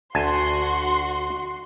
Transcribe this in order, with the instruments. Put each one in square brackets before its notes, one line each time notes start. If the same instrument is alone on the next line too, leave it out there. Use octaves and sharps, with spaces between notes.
[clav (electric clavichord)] D2 G#5 A5 [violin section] F#4 C6